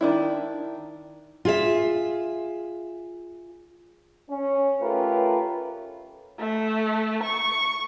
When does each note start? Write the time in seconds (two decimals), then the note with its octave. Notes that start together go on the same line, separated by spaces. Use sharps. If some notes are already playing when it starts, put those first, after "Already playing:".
0.01 D#3 D4 E4
1.45 F4 G#4 E5
4.29 C#4
4.81 A3 C#4 F4 G4 A#4 B4
6.40 A3
7.24 C#6